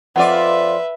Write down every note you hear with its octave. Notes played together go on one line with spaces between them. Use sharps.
F2 F4 B4 D5 E5 F#5